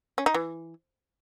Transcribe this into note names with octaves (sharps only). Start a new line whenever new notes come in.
C#4
D#4
E3